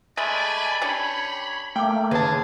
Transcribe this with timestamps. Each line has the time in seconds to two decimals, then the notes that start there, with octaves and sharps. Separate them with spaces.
0.17 G#3 A3 D5 G#5 B5
0.82 C#4 D4 G4 C#5 B5
1.76 A3 A#3 G5 D6
2.11 D#2 C#3 G#4 B4 A5